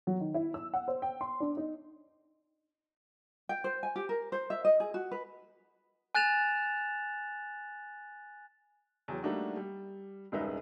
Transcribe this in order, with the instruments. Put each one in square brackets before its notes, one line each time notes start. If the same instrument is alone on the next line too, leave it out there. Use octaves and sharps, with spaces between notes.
[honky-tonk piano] F#3
D#3
E4
E6
F#5
C5
G5
C6
D4
D#4
[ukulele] G5
C5
G#5
G4
A#4
C5
E5
D#5
G#4
F#4
B4
[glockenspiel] G#5 F#6 A6 E7 F7
[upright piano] E2 E3 F#3 G5
G3 A3 A#3 D4 D#4 F#4
G3
E1 C#2 G2 D#4 B4 E5